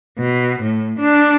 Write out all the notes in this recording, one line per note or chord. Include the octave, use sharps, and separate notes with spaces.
B2
A2
D4